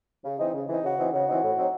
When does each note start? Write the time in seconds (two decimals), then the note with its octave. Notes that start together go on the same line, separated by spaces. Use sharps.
0.24 C#3
0.39 E3 C4 D#4
0.54 C#3
0.68 E3 C4 D#4
0.83 C#3 F#4
0.98 E3 C4 D#4
1.13 C#3 F#4
1.28 E3 C4 D#4
1.43 A2
1.58 F#3 C4 D#4